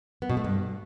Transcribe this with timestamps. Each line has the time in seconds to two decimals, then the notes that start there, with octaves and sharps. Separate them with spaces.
0.22 B3
0.30 B2
0.37 A3
0.44 G2